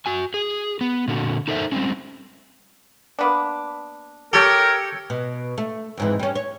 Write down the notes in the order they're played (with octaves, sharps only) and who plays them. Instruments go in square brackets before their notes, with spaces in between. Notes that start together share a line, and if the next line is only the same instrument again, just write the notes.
[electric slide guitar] F#4 G#5
G#4
B3
A#2 D3 F#4
D#4 A4 A#4 C5 D5 E5
G3 C4 C#4
[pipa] A#3 B3 D4
[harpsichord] G4 [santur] A4 C#5 G5 [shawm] A#4
[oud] B2
A3
F2 G#2 E3
G3 C#4
C#5